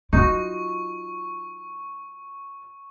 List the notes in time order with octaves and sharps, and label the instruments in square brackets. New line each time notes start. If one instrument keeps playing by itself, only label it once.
[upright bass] F#3 F4 [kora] D#4 F#4 [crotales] C#6